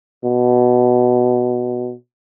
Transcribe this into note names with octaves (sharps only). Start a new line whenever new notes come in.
B2